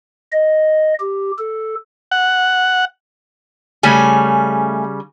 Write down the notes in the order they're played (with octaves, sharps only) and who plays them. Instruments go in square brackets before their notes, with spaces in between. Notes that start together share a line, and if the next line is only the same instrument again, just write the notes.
[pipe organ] D#5
G4
A4
[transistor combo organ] F#5
[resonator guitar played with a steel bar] C#3 G3 C#4 [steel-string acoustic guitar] A3 G#5